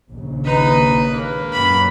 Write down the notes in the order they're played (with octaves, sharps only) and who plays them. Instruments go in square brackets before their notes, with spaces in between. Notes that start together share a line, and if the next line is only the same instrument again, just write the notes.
[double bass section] A#1 D#2 C#3
[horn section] D#4 [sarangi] B4
[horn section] G#3 A#3 B4
[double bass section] F#2 A#2 [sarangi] B5